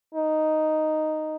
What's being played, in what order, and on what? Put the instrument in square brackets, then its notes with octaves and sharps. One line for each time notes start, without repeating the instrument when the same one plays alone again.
[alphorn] D#4